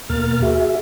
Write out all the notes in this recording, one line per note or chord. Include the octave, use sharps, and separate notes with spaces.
D#2 B2 A#3 A#4 F6 A6
F#4 G#4 E5